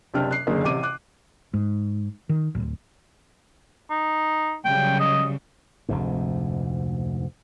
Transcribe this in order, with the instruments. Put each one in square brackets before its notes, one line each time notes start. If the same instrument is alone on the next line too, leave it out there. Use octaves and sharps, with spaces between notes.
[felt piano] F#1 C3 D4 G5 F6
F#6 C7
F#1 D3 A#3 G#4
A1 C3 D6 D#7
D6 F#6
[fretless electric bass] G#2
D#3
D1
[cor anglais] D#4
[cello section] C#3 F#3 G3 [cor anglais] G5
[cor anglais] D#5
[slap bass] F1 D2 G#2